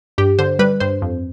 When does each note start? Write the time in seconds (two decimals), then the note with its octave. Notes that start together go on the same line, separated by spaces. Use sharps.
0.18 G2 G4
0.39 D3 C5
0.59 G3 B4
0.80 G2 C5
1.02 F2